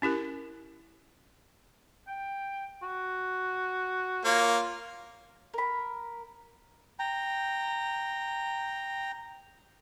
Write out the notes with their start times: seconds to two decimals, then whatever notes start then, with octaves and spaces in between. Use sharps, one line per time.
0.02 C#4 E4 G4 A#4
2.08 G5
2.83 F#4
4.25 A#3 F4 C#5
5.54 A#4 B5
6.99 G5 A#5